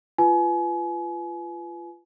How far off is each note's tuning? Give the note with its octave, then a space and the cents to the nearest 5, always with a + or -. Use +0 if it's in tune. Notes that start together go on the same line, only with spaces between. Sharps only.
F4 -25 B4 +0 G#5 +30